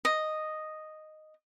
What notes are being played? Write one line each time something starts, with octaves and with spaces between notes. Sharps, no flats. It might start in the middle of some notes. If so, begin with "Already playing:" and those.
D#5